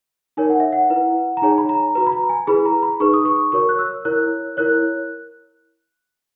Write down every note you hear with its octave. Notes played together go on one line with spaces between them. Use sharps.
D#4 A#4 C#5 G#5
F#5
E5
F#5
E4 B4
A#5
D#4 G#4 C#5 G#5
B5
A#5
F#4 B4 A#5
B5
A#5
G#5
E4 G#4 B4 B5
A#5
B5
D#4 G#4 B4 C#6
D#6
C#6
F#4 A#4 C#5 C#6
F#6
E6
E4 A#4 C#5 F#6
E4 A#4 C#5 F#6